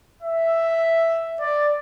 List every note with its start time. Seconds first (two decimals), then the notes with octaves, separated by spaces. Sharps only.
0.23 E5
1.41 D5